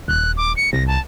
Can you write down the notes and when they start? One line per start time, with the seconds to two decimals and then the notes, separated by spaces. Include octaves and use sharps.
0.08 D#1 F#6
0.37 D6
0.57 C#7
0.73 C2 A#6
0.87 A5